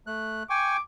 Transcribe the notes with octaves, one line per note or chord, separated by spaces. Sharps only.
A3 F#6
G5 G#5 C#6 D6